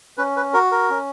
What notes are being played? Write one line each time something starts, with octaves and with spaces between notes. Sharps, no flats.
C#4 B4
B4
F#4 A#4
A#4
C#4